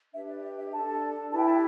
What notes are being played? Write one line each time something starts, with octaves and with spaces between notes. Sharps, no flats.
D4 G4 B4 E5
D5
E5
E5
D4 A4 A5
A5
E4 G4 B4 A5
G5
A5